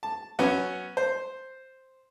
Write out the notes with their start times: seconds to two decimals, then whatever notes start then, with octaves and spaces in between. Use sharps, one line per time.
0.03 A5
0.39 F#3 B3 C#4
0.97 C5